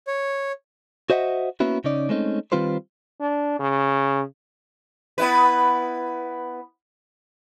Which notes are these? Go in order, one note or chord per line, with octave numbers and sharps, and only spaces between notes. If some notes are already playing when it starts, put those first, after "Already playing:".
C#5
F#4 C5 D#5 E5 F#5
A#3 B3 C#4 E4 F#4
C#3 C#4 D#4 D5
G#3 A3 C4 C#4 D#4
D#3 G3 C4 F4 B4 C5
D4
C#3
B3 E4 B4